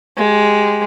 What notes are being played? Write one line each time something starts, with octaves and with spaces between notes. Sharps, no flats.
G#3 G4